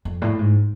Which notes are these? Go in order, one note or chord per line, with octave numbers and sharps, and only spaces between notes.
F2
A2
G#2